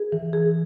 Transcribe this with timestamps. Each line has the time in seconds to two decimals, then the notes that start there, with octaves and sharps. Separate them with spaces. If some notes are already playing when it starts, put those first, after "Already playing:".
Already playing: G#4
0.12 E3
0.33 G#4